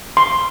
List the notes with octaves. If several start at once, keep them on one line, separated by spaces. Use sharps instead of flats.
C6